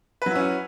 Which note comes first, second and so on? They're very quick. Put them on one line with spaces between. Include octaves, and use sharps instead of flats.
B4 F#3 E4 C#4 F#4